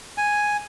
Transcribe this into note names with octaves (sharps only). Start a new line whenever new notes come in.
G#5